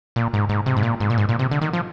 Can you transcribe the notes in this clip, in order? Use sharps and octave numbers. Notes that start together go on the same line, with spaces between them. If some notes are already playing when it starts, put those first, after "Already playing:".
A#2
G#2
G#2
C3
G#2
A#2
G#2
A#2
G#2
A#2
C3
D3
D#3
F3